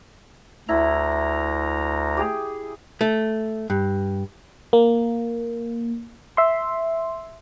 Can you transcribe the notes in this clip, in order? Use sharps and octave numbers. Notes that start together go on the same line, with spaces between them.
D2 E4 A#5
G4 G#4
A3
G2
A#3
E5 C6